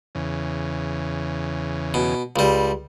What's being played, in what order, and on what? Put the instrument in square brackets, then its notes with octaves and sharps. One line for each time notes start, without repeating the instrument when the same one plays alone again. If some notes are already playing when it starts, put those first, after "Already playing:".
[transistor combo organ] E2 C#3
[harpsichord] B2
C#2 G3